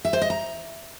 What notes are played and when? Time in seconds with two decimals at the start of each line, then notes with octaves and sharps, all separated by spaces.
0.05 E5
0.13 C5
0.21 D#5
0.30 A#5